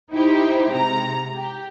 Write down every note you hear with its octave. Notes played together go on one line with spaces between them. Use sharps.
D#4 E4 G4 C5
G#2 C3 A#5
G4